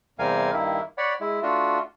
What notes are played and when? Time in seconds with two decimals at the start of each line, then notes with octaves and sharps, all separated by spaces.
0.19 E2 C3 G3 A#4 F5 G#5
0.52 G2 D#3 A#3 E4
0.98 C#5 D5 F#5 B5
1.21 G#3 E4
1.43 A3 D4 F4 F#4